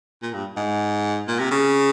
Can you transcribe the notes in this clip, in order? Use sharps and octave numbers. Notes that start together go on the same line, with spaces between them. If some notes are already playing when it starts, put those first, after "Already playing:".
A#2
G2
G#2
A#2
C3
C#3